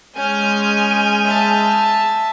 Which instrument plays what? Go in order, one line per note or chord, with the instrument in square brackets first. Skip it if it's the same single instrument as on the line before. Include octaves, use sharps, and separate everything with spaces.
[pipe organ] G#3 F6 G6 [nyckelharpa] C#4 [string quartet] G#5
[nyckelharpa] E5 A5